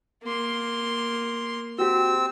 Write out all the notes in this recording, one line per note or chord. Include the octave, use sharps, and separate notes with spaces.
A#3 C6
C4 F#4 G4 E6